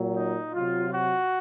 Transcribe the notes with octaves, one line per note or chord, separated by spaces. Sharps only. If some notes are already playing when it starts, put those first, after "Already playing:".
Already playing: A#2 F#3
D#4
C3 F#3 F4
F#4